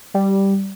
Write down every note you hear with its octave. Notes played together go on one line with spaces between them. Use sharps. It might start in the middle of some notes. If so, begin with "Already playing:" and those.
G3